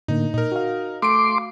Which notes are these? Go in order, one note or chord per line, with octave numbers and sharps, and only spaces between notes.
A2 D3 A#3 D#4
A#2 D#4 A#4
F#4 F5
A3 C6 D6 D7